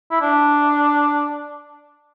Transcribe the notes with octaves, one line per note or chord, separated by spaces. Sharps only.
E4
D4